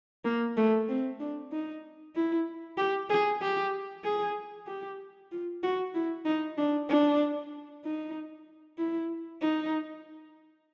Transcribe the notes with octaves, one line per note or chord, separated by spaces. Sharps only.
A#3
A3
C4
D4
D#4
E4
G4
G#4
G4
G#4
G4
F4
F#4
E4
D#4
D4
D4
D#4
E4
D#4